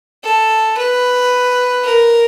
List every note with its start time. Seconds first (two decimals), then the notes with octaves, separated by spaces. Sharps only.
0.24 A4
0.77 B4
1.84 A#4